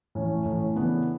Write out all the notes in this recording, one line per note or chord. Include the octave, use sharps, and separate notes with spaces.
A2 E3 A3 C#4
A2 E3 A3 C#4
C#3 E3 B3 D4